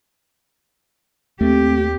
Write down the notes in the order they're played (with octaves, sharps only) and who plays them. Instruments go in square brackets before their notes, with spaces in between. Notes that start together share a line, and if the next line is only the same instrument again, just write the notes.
[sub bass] D#2 [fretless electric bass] A3 [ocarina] C4 [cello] G4